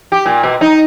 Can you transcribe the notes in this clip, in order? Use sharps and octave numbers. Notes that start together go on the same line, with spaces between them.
G4
A#2
B2
D#4